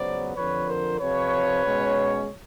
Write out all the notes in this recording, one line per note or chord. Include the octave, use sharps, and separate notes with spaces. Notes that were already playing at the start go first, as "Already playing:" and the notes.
Already playing: C#2 C#3 F#3 B3 C5 D5
F2 D3 F3 B4 C#5
A#4 C5
F2 C3 F3 B4 C#5
B2 G#3 C#4